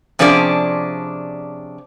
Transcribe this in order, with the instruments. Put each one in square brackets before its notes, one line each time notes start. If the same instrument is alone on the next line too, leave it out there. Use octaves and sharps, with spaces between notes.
[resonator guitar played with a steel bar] C3 F3 C#4 D4 G#4 D5